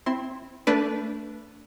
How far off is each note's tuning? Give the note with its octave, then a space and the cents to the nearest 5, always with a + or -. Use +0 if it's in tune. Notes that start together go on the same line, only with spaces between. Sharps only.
C4 +0 E4 +0 C6 +20
A3 +20 D4 -15 B4 +0